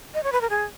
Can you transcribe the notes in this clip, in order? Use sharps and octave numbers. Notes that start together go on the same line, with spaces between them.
D#5
C#5
B4
A#4
G#4